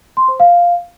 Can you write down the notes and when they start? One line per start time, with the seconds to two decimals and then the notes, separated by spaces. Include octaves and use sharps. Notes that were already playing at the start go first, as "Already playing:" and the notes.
0.17 C6
0.28 C5
0.40 F5